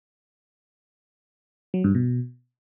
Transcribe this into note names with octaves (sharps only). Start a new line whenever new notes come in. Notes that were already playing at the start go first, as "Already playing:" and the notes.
F#3
G2
B2